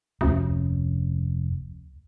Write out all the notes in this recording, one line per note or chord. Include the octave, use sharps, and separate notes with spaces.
F1 D2 C#4